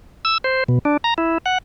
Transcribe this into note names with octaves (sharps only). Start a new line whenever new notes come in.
E6
C5
B2
D4
A#5
E4
F#5